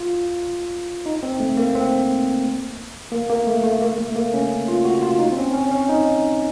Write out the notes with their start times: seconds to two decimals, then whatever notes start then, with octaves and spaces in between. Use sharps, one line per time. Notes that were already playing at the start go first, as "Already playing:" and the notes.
Already playing: F4
1.06 D#4
1.23 C4
1.40 A3
1.57 A#3
1.75 C4
3.12 A#3
3.30 A#3
3.47 A3
3.64 A3
3.82 A#3
3.98 A3
4.16 A#3
4.34 C#4
4.68 F4
4.85 F#4
5.02 F4
5.19 D#4
5.32 C4
5.37 C#4
5.54 C#4
5.71 C#4
5.89 D#4